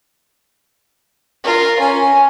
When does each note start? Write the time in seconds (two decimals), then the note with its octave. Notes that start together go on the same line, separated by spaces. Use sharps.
1.44 F4 A#4
1.80 C#4 G#5